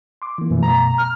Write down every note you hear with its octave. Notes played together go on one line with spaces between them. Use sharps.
C6 D6
E3 A#3
F#2 B2 E3 A3
A#5
F6